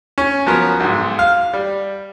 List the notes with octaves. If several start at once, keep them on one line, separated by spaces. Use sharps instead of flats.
C#4
F3 F#3 B3 C#4 A#4
B1 G#2
F5
G3